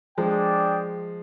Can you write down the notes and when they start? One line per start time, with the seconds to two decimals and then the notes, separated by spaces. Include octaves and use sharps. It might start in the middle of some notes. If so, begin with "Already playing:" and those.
0.18 F3 G#3 D4 G#4 D5 G5